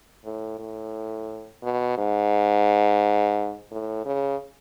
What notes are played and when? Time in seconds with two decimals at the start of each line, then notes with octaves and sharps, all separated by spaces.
0.25 A2
0.59 A2
1.63 B2
1.98 G#2
3.71 A2
4.06 C#3